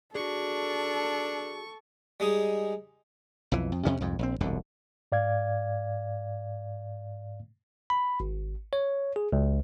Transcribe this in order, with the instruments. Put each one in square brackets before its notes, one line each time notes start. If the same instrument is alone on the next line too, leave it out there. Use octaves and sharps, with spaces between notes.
[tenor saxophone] D4 [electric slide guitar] F#4 G#4 [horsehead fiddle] A4 [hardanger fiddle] C#6
[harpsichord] G3 G#3 D#4 G#4
[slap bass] B1 F2 E3
F2
F2 C3 C#4
C2 F2 G#2
A#1 C4
E1 C2 F#2 D3
[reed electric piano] G#2 D5 F5 G#6
[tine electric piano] B5
G#1
C#5
G#4
C#2